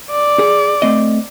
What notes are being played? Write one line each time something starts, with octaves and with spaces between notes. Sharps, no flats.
D5
G#4
A3 C4 D#5